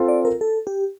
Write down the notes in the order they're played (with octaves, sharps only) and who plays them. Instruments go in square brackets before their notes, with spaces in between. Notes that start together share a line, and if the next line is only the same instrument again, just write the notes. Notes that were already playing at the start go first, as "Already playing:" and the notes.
Already playing: [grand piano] C4 F4 A4
[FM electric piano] D5
A#4
A4
G4